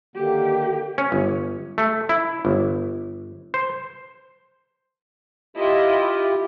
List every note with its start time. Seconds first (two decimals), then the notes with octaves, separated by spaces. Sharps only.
0.16 D3 D#3 A#3 G4
0.98 C#4
1.12 G1
1.78 A3
2.09 E4
2.45 G1
3.54 C5
5.57 E4 F4 G4 D#5